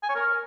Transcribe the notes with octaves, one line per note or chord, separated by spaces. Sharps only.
G#5
C#5
A#4